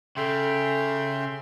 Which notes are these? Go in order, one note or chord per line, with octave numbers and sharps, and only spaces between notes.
C#3 A4 E5 G5 C6